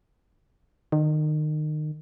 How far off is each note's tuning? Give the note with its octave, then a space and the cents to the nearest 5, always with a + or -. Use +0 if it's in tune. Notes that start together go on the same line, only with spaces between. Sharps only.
D#3 -30